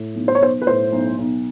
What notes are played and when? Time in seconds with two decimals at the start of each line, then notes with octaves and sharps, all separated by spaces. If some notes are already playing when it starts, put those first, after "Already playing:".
Already playing: A2
0.15 B1
0.28 C5
0.35 C#5
0.40 B1 C5
0.62 B4
0.67 A2 C5
0.92 B1
1.18 B1